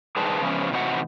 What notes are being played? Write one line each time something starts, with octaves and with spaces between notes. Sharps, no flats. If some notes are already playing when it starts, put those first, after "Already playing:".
G2 D#3 G#4 B4 C5 A5
C#3 F3 G#3 B3 C#4
A2 C3 E3 D#4 F#4 F#5